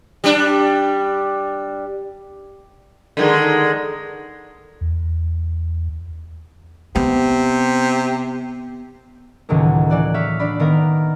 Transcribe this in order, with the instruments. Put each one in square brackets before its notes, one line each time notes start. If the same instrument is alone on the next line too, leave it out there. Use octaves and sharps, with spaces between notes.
[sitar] G3 D4
D3 D#3 G#3
[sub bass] E2
[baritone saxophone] C3 [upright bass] B3
[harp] C#2 A2 D#3 E3 F#3 A#3
E3 D5 F#6
C#5 E5 F5 B6
D4 D5 B5
D#3 B3 A#4 F5